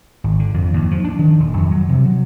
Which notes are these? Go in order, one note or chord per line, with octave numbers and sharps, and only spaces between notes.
G#1
D3
F2
D#2
F3
D4
D#3
D#1
F2
F#3
C3
F#3